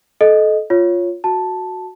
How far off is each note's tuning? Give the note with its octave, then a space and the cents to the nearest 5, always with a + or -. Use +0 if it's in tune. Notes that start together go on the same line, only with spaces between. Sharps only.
A4 -25 D#5 +0
F4 +0 C#5 +0
F#4 -5 A5 +0